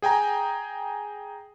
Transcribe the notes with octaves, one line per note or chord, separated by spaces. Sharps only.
G#4 G5 G#5 A#5